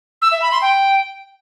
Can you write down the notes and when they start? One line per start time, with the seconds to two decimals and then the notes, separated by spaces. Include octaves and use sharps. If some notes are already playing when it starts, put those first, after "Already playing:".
0.22 E6
0.32 E5
0.42 B5
0.52 C6
0.62 G5